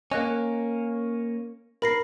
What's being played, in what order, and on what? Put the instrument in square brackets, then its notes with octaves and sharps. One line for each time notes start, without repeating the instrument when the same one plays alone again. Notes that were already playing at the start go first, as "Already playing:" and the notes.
[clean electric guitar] A#3 C#4 [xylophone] D#5 F#6
[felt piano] A#4 [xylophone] B5 A#6 C7